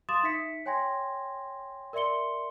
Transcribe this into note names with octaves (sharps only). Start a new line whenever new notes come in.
F5 C6 D6 D#6 A6 E7
D#4 E5 B6 C#7
C#5 G5 G#5 C6 G#6 A#6
A#4 D5 E5 C6 C#7 G7